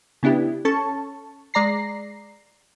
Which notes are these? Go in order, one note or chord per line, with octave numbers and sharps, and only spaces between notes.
C#3 B3 D4 E4 G4
C#4 A4 A5 C#6
G#3 D5 A#5 A#6 C7